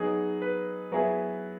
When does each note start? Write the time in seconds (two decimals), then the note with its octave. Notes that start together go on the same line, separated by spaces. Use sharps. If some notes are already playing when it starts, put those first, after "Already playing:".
Already playing: F#3 B3 D#4 G#4
0.42 B4
0.92 F#3 B3 E4 G#4